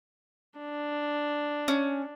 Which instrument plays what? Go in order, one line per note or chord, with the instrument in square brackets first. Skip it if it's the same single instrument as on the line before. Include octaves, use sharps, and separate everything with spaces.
[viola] D4
[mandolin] C#4